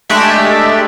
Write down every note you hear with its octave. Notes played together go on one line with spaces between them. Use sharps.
G#3 A3 D4 G4 D5 E5